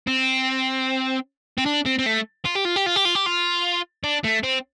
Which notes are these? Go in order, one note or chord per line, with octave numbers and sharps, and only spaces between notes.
C4
C4
D4
C4
C4
A3
F4
G4
F4
G4
F4
G4
F4
G4
F4
D4
A3
C4